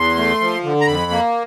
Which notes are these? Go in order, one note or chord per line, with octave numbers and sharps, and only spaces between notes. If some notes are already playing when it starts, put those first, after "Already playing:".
Already playing: E2 C6
A3
F3
D3
A#5
F2 B5
A#3